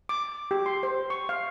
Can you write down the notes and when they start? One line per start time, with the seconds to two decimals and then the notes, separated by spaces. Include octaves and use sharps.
0.09 D6
0.51 G4
0.66 C6
0.83 C5
1.10 C#6
1.29 F5